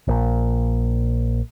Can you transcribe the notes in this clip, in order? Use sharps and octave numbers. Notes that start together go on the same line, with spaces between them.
A#1 A#2